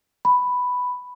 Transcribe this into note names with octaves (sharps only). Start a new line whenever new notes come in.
B5